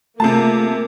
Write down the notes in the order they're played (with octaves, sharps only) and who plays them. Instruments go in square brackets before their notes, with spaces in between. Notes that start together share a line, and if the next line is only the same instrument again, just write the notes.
[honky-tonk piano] C3 A5 [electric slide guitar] A3 F4 G#4 [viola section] A#3